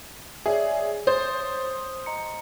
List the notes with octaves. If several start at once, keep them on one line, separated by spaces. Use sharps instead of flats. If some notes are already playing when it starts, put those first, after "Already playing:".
G#4 C#5 D5 E5
C5 C#5 D#6 A6
D#6
D#5 A#5 C#7